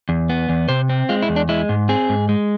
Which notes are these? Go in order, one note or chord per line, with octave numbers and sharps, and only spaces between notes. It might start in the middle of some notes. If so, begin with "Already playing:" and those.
E2
B3
E2
C3 C5
C4
G#3 F4
E4
E2
D4
G#3 E4
G#2
C4 G#4
G#2
G#3